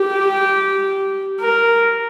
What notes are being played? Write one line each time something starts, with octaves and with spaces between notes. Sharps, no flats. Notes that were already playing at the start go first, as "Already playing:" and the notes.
Already playing: G4
A#4